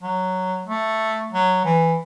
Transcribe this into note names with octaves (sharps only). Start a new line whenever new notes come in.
F#3
A3
F#3
E3